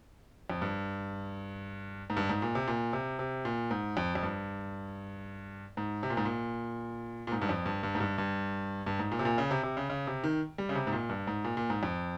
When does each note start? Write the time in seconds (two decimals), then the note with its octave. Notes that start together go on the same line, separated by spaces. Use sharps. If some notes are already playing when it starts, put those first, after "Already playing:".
0.50 F2
0.62 G2
2.10 G#2
2.17 G2
2.29 G#2
2.42 A#2
2.55 C3
2.68 A#2
2.93 C3
3.19 C3
3.45 A#2
3.71 G#2
3.97 F2
4.15 F2
4.23 G2
5.77 G#2
6.03 C3
6.10 A#2
6.17 G#2
6.25 A#2
7.27 A#2
7.32 G#2
7.42 G2
7.49 F2
7.66 G2
7.83 G2
7.95 G#2
8.00 G2
8.18 G2
8.87 G2
8.99 G#2
9.12 A#2
9.19 C3
9.25 A#2
9.38 C#3
9.51 C3
9.63 C3
9.77 C#3
9.90 C#3
10.07 C3
10.24 D#3
10.58 G3
10.69 C#3
10.75 C3
10.87 G#2
10.93 A#2
11.09 G2
11.27 G#2
11.45 A#2
11.57 A#2
11.70 G#2
11.83 F2